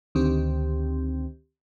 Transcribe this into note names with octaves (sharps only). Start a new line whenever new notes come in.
D2 D#3 C4 G4